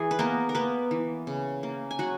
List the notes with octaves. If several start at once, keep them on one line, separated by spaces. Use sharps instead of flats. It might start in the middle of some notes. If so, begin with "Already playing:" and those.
Already playing: E3 G#4
B4
A#3 B3 A#4
A#4
A#3 B3 B4
E3
C#3
A#3
G#5
F#3 F#4 F#5